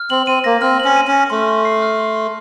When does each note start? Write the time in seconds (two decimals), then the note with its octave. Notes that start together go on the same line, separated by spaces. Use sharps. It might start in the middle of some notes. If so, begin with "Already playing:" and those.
Already playing: F6
0.10 C4 F#7
0.27 C4 D#7
0.44 A#3 A#6
0.62 C4 F6
0.80 C#4 F#7
0.96 D#7
1.08 C#4
1.13 A#6
1.30 A3 C6
1.48 C6
1.65 C7
1.82 F6
1.99 C6
2.16 C6